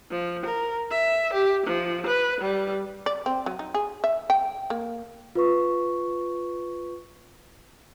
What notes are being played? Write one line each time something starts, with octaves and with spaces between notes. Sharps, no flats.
F3
A#4
E5
G4
F3
B4
G3
D5
C4
F#3
D#4
G#4
E5
G5
A#3
F4 B4 C#6